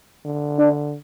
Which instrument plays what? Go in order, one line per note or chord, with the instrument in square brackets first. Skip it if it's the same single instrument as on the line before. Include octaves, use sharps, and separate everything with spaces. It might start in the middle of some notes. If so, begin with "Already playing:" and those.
[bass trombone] D3
[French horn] D4